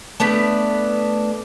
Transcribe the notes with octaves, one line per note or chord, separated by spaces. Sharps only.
A3 B3 D4 B4